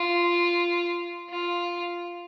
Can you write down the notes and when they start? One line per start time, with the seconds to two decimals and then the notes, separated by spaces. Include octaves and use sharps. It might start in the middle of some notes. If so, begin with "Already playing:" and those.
Already playing: F4
1.29 F4